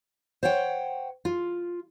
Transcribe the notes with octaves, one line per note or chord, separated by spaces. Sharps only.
C5 C#5 F#5 G5
F4